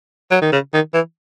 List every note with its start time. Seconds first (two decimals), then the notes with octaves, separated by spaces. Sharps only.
0.31 F#3
0.42 D#3
0.52 C#3
0.74 D#3
0.94 E3